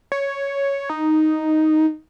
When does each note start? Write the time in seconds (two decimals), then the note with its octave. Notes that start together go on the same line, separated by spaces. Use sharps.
0.12 C#5
0.90 D#4